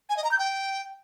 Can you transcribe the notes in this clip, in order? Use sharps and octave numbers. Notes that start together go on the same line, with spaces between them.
G#5
D#5
A#5
G6
G5